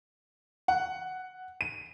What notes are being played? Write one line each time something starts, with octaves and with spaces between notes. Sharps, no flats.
F#5
D#7